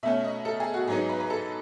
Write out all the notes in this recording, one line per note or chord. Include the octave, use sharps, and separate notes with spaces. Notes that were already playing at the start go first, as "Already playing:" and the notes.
B2 A3 C#4 E5
D#5
A4
G#4
F#4
G#2 F#3 B3 D#4 G#4
B4
B4
A4